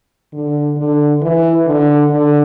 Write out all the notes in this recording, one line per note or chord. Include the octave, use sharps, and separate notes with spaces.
D3
D3
E3
D3
D3